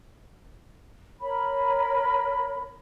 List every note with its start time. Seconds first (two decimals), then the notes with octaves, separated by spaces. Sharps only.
1.20 A#4 C#5 B5